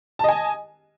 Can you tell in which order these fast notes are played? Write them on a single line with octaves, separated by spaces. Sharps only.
A5 D#5 G#5